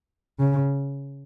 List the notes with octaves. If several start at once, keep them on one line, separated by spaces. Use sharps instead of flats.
C#3